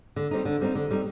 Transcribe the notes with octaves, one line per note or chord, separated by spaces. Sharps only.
D3
G3 C4 D#4
D3
G3 C4 D#4
D3
G3 C4 D#4